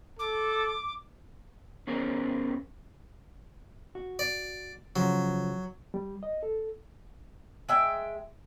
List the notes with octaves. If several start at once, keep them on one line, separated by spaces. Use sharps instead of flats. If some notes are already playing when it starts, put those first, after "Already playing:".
A4 D6
B3 C#4 G#4 A#4 C5
F#4
D5
C#3 F3 F#3
G3
D#5
A4
G#3 E5 G5